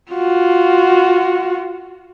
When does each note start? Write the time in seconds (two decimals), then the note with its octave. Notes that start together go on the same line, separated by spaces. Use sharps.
0.11 F4 F#4